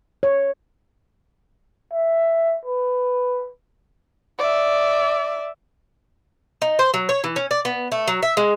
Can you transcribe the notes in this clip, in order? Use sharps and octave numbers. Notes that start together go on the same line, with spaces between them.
C#5
E5
B4
D5 E5
D#4
C5
F#3
C#5
E3
C#4
D5
B3
A3
F#3
E5
G#3